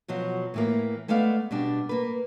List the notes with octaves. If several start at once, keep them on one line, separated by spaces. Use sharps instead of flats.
B2 F3 F#3
A2 E3 A#3
G#3 A3 B3 D5 F5
B2 G3 D4
A#3 B4